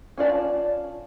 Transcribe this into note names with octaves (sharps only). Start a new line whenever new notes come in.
C#4 F4 D5 A5